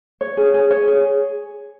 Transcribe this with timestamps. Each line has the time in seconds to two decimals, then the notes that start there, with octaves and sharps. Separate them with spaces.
0.21 C#5
0.37 G#4
0.54 G#4
0.71 C#5
0.87 G#4